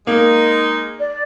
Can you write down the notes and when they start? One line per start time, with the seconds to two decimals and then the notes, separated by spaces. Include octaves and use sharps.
0.07 G#3 A#3 D#4 A#4
0.99 D5